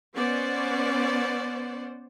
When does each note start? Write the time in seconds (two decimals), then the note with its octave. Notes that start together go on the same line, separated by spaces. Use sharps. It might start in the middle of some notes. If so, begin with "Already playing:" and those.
0.16 B3 C#4 C5 D5 F#5